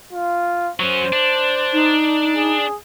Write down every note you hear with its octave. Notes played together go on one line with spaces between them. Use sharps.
F4
F#3 C#4 C5
D4
D#4
G#4